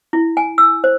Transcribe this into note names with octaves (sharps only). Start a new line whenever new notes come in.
E4
G#5
E6
C5